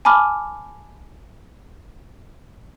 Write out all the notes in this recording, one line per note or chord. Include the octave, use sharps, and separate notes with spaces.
G#5 A5 B5 D6 F6